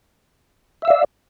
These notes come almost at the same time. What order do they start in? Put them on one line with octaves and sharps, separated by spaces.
E5 E6 F5 D5